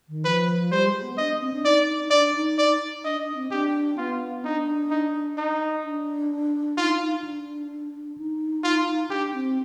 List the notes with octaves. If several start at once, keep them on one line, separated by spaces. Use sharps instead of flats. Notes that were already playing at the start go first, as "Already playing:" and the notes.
D#3
F3 B4
G3 C5
G#3
B3
D4 D#5
C4
D4
D#4 D5
D4 D5
D#4
D5
D4 D#5
D4
C4
D4 G4
B3 F4
D4 D#4
D#4
D#4
D4
D#4 F4
D4
D#4
F4
D4 G4
C4